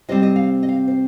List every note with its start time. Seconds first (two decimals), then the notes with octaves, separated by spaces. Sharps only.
0.09 C3 G3 C4 D#5
0.23 D#5
0.36 F5
0.63 D#5
0.69 F5
0.88 C5